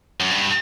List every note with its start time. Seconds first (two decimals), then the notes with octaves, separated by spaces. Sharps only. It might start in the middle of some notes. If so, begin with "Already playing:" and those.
0.20 F#2
0.30 G2